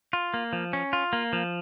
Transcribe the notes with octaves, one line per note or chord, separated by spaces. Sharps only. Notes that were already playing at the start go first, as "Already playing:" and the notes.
F4
A#3
F3
C#4
F4
A#3
F3